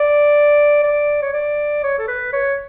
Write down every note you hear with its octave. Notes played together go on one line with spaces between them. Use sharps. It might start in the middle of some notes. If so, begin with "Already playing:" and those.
Already playing: D5
D5
C#5
D5
C#5
A4
B4
C#5